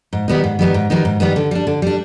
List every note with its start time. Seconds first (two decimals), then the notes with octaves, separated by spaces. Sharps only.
0.13 G#2
0.28 D#3 G3 B3 D#4
0.44 G#2
0.59 D#3 G3 B3 D#4
0.74 G#2
0.90 D#3 G3 B3 D#4
1.05 G#2
1.20 D#3 G3 B3 D#4
1.36 D3
1.51 G3 D4
1.67 D3
1.82 G3 D4